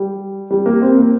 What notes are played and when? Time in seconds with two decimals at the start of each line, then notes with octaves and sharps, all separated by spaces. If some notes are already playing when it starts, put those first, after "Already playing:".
Already playing: G3
0.51 G3
0.66 A#3
0.82 C4
0.97 A#3